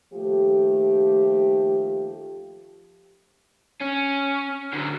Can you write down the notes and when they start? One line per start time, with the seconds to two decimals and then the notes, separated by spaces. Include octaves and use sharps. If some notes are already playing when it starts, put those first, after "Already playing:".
0.13 D#2 F3 A3 G4
3.81 C#4
4.73 D3 F#3